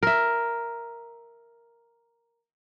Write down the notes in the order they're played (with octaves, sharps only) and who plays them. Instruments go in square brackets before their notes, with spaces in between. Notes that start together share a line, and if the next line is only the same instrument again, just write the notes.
[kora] A#4 E5